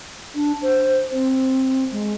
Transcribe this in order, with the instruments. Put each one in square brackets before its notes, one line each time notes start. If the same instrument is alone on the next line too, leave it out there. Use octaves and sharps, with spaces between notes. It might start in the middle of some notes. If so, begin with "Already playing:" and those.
[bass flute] D4
C5
C4
G#3